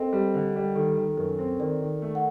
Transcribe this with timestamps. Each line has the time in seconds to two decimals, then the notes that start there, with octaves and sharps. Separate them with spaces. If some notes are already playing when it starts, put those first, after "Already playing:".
Already playing: C4 A4 A#4 D#5 G5
0.13 G3
0.34 D3
0.56 G3
0.75 D#3 A4
0.97 D#3
1.17 F#2 A#4
1.39 C4
1.59 D#3 A#4 D5
1.81 D#3
2.02 A3
2.15 F#5